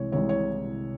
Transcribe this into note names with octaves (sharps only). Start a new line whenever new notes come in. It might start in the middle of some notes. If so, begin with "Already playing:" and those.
Already playing: C2 C3 E3 G#3 C#5
C2 C3 E3 G#3 C#5
C#5